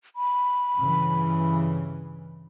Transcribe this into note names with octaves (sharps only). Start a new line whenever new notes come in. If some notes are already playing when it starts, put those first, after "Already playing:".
B5
G2 C#3 E3